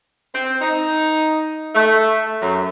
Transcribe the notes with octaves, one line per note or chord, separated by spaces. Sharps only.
C4
D#4
A3
F#2